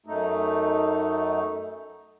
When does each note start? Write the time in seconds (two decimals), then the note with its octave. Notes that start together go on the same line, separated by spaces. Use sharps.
0.06 F#2 A3 D#4